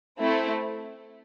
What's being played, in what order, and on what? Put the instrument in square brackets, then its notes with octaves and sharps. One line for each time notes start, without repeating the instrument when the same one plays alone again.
[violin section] A3 C4 E4